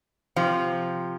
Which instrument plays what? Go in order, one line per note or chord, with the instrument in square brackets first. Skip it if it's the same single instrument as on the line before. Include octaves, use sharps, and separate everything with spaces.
[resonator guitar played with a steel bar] C3 F3